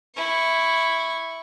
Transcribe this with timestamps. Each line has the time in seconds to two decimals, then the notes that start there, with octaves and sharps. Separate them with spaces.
0.15 E4 C#6